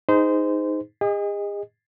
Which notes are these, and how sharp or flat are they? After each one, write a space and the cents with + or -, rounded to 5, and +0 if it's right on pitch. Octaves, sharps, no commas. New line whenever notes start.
D#4 +5 G#4 -10 C5 -25
G#4 -40 D#5 +0